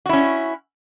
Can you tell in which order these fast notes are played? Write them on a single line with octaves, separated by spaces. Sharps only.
F#4 E4 C#4